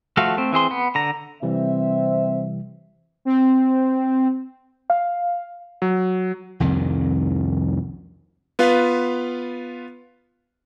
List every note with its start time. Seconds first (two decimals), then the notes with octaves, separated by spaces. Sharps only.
0.17 F3 A3 F#4 A4 F5
0.37 A3 C4
0.52 E3 C4 G#4 C6
0.71 B3
0.95 D3 A#5
1.42 C3 E3 G3 C4 E5
3.25 C4
4.90 F5
5.82 F#3
6.60 C2 F2 D#3
8.59 B3 F4 B4 F5